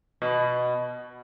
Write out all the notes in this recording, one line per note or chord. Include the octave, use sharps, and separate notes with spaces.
B2